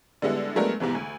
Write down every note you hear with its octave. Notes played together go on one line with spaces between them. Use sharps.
D3 G3 G#3 B3 E4
F#3 G#3 A3 B3 D4 A#4
E2 G#2 C3 E3
D2